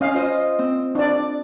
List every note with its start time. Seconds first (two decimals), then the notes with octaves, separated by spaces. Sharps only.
0.01 C#4 D#5 F5
0.14 F4 C5 D#5
0.59 C4
0.95 D4 D5